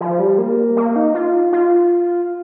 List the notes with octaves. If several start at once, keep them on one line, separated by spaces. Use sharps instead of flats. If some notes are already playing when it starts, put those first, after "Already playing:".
F3
G3
A#3
A#3
D#4
F4
F4